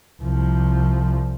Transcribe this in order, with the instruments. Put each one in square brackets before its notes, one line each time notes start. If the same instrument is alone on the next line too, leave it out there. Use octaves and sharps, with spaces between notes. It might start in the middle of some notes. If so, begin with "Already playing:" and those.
[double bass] C2 F3